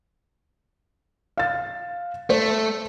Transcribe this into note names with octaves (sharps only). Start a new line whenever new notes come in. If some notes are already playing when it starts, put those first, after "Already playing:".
F5 A6
A3 C5